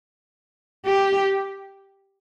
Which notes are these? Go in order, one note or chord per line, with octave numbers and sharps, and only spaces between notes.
G4